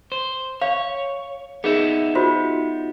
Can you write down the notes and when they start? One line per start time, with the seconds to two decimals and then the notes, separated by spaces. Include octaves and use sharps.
0.12 C5
0.62 C#5 F5
1.64 B3 D#4 G#4 E5
2.15 F4 F#4 C5